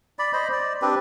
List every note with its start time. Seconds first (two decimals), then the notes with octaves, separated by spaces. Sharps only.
0.19 D5 B5
0.33 C5 D#5 B5
0.52 D5
0.82 C4 D4 G4 B4